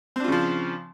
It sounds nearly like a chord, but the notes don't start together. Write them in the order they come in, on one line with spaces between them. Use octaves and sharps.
C4 D4 F4 C#3 F3